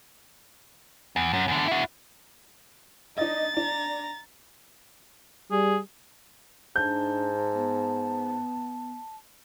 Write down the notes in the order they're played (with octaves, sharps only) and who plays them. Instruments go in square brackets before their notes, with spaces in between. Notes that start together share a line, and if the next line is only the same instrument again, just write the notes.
[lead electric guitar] E2
F#2
E2 D3
E4 F#4
[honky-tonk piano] D4 D#5 [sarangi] D#4 [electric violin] A6
[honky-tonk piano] D4 [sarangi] A#5
[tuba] G3 [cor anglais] G#4
[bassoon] G#2 [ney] D4 [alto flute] A5 [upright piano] G6
[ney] B3